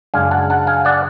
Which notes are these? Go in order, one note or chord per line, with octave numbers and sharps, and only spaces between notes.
F#2 C#3 G#3 D4 F5 G#5
F#5 A5
F#5 A5
F5 G#5
D5 F#5